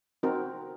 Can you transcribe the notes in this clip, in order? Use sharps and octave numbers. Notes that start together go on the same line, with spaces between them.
C4 D#4 F#4 A#4